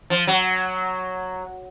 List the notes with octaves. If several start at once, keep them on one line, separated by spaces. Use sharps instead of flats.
F3
F#3